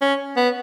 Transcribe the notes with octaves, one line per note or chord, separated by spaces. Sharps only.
C#4
B3